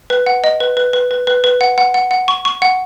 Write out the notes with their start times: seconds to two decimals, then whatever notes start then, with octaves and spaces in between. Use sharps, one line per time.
0.10 B4
0.26 F#5
0.44 D#5
0.60 B4
0.77 B4
0.93 B4
1.11 B4
1.27 B4
1.44 B4
1.61 F#5
1.78 F#5
1.94 F#5
2.11 F#5
2.28 C#6
2.45 C#6
2.62 F#5